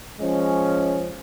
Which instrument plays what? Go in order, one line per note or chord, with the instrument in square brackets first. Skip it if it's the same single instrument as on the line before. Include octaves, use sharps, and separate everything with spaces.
[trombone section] F3 G#3 C#4